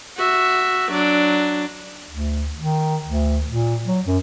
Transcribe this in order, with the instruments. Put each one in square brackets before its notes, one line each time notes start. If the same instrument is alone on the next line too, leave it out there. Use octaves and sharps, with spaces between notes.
[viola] F#4 E5
F#3 D4
[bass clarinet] D2
D#3
D2
A#2
F#3
F#2